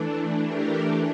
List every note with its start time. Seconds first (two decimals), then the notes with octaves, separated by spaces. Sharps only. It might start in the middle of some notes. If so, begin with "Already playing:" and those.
Already playing: E3 A3 D4
0.40 G4 A#4